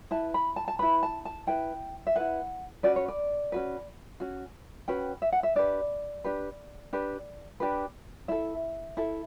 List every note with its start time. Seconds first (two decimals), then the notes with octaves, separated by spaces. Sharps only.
0.11 E4 B4 A5
0.34 B5
0.56 A5
0.68 A5
0.79 E4 B4 B5
1.03 A5
1.25 A5
1.47 E4 B4 G5
2.07 E5
2.16 E4 B4 F#5
2.83 C#4 F#4 B4 D5
2.96 C#5
3.08 D5
3.52 C#4 F#4 B4
4.20 C#4 F#4
4.88 C#4 F#4 B4 G5
5.22 E5
5.32 F#5
5.43 E5
5.55 D4 G4 B4 D5
6.24 D4 G4 B4
6.93 D4 G4 B4
7.60 D4 G4 B4
8.28 E4 A4 E5
8.97 E4 A4